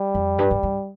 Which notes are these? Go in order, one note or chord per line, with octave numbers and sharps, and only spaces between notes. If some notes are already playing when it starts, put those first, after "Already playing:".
Already playing: G3
F2
G2
G2
G2